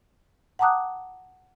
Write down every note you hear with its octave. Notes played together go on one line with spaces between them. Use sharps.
F#5 A5 A#5 D6 D#6 F#6